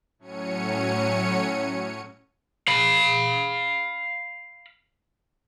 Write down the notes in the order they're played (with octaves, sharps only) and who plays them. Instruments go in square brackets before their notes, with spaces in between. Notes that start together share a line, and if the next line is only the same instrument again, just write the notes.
[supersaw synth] A2 F#3 C#4 C#5 C#7 D#7
[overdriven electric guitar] F5 B5